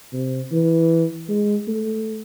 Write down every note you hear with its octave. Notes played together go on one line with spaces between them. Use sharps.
C3
E3
G#3
A3